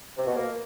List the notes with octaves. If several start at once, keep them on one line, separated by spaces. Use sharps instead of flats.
C3
B2
A#3